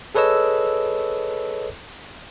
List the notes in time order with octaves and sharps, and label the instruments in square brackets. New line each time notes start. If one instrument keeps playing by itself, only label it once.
[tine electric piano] G#4 A4 B4 C#5 D#5 E6